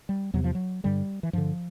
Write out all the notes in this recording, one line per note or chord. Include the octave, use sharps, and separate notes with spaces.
G3
E2 C3 F#3
F3
F#3
G2 D3 G3
E3
G2 D3 F3